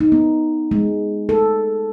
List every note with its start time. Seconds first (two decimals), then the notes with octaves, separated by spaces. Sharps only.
0.01 D#4
0.12 B3
0.71 G#3
1.29 A4